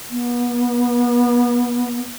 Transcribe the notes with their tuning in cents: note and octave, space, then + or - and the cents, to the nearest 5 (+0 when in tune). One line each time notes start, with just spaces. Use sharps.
B3 -35